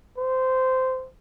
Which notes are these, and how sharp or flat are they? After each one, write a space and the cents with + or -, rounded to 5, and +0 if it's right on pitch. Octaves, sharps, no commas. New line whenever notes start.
C5 -15